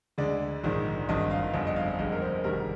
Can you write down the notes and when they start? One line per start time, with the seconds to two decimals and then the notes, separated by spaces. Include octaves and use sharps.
0.18 D2 D3 G#3 D5
0.64 A#1 G#2 D#3
1.08 G#1 G2 D#3 G#3 D#5
1.31 F5
1.53 G1 F2 D3 D#5
1.67 D#5
1.76 F5
1.99 G1 F2 D3 G#3 D#5
2.12 A#4
2.22 C5
2.44 F1 D#2 D#3 G3 A#4